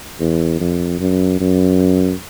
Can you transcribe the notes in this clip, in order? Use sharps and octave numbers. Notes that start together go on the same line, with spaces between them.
E2
F2
F#2
F#2